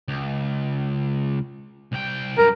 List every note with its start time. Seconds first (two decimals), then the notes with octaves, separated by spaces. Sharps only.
0.08 C#2
1.92 C2 G5
2.38 F#2 G3 A#4